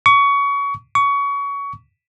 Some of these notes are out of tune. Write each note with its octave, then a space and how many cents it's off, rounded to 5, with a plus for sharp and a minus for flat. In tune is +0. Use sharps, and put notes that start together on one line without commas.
C#6 +25
C#6 +25